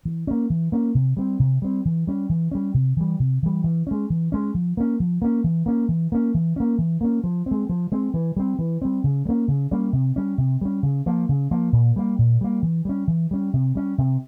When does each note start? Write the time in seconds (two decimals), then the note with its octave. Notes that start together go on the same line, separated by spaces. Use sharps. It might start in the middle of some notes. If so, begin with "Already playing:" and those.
0.05 E3
0.27 A#3 C#4
0.50 E3
0.72 A#3 C#4
0.95 C3
1.17 G3 C4
1.39 C3
1.62 G3 C4
1.85 E3
2.07 G3 C#4
2.29 E3
2.51 G3 C#4
2.74 C3
2.97 E3 G3
3.19 C3
3.43 E3 G3
3.64 E3
3.87 G#3 C#4
4.10 E3
4.32 G#3 C#4
4.54 F3
4.77 A#3 C#4
5.00 F3
5.22 A#3 C#4
5.44 E3
5.66 A#3 C#4
5.88 E3
6.12 A#3 C#4
6.34 E3
6.56 A#3 C#4
6.78 E3
7.01 A#3 C#4
7.24 F3
7.46 C4
7.51 G#3
7.69 F3
7.92 G#3 C4
8.14 E3
8.37 G3 C4
8.59 E3
8.82 G3 C4
9.04 C#3
9.25 G3
9.29 A#3 C#4
9.48 C#3
9.71 G3 A#3 C#4
9.93 C3
10.16 G3 C#4
10.38 C3
10.61 G3 C#4
10.83 C#3
11.06 F3 A#3
11.29 C#3
11.51 F3 A#3
11.73 A#2
11.96 G3 A#3
12.19 A#2
12.41 G3 A#3
12.63 E3
12.85 G3 C#4
13.08 E3
13.31 G3 C#4
13.53 C3
13.75 G3 C#4
13.98 C3